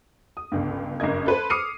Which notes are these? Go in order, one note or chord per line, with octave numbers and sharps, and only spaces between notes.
D#6
G1 C#2 G2
F#1 G2 A#4 D#5 G#6
A4 B4 C5
D6 D#6 F6 C7 C#7 D#7